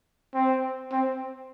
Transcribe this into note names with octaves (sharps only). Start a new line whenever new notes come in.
C4
C4